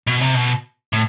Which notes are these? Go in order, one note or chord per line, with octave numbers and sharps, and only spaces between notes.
B2
C3
B2
A2